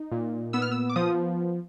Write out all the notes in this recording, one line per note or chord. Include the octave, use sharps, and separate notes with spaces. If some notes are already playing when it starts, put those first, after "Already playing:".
Already playing: D#4
A#2
B3 E6
F6
E6
D6
F3 D#6